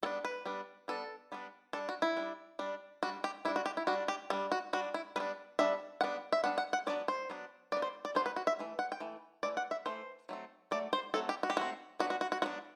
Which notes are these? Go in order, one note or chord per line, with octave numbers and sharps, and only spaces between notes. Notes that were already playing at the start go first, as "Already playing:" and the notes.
G3 B3 D4 A4
B4
G3 B3 D4
G3 B3 D4 A4
G3 B3 D4
G3 D4 A4
F#4
E4
G3 D4
G3 D4
G3 D4 F#4
G4
G3 D4 E4
F#4
G4
E4
G3 D4 F#4
G4
G3 D4 A4
F#4
G3 D4 F#4
E4
G3 B3 D4 B4
G3 B3 D4 E5
G3 B3 D4 F#5
E5
G3 B3 D4 F#5
F#5
F#5
F#3 B3 D4 D5
C5
F#3 B3 D4
F#3 B3 D4 D5
C5
D5
F#3 B3 D4 C5
B4
F#4
E5
E3 A3
F#5
G5
E3 A3
E3 A3 D5
F#5
E5
E3 A3 C5
F#3 A3 C4
F#3 A3 D5
C5
F#3 A3 C4 A4
G4
F#4
G4
F#3 A3 C4 F#4
F#3 B3 D4 F#4
F#4
F#4
F#4
F#3 B3 D4 F#4